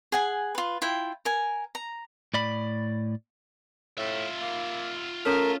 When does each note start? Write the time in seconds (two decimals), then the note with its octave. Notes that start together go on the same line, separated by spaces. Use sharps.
0.12 G#4 F#5 G#5
0.55 F4 B4
0.82 E4 F4 G5
1.25 A#4 G#5
1.75 A#5
2.34 A2 D5 B5
3.98 A2 F4 E5
4.42 A#3
5.25 A3 C#4 A#4 C#5 F6